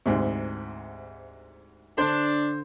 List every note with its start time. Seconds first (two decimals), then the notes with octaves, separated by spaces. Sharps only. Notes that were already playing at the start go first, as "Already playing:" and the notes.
0.06 D2 G#2 C3
1.98 D3 D4 C5